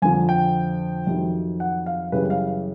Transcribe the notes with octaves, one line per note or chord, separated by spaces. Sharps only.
F2 D3 F3 G#5
G5
F2 C3 D#3 F#3
F#5
F5
F#2 C#3 E3 G3 B4
F5